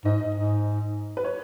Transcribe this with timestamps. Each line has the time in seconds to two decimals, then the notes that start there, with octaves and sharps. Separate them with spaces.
0.05 G#2 D#5
0.35 G#2
1.17 B4
1.24 C#5